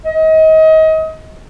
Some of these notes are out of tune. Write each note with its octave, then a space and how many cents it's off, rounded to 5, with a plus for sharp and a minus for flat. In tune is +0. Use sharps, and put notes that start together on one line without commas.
D#5 +30